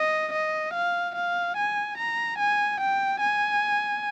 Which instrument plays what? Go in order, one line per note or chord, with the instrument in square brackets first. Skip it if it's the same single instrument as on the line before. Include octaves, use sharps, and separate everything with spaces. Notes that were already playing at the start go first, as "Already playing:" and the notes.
Already playing: [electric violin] D#5
D#5
F5
F5
G#5
A#5
G#5
G5
G#5